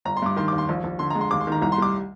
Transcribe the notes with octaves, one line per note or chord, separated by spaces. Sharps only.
G1 A#5
C6
G2 D6
D#3 C6
D#2 D6
C6
A#1
A#1
D3 C6
A#5
G#3
C6
D#2 D6
C6
D#3 A#5
C2 A#5
C6
G3 D6